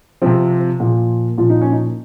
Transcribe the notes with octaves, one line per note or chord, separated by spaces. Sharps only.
C3 F3 C4
A#2 F3
A#2 F3 F4
D#4
C#4
D#4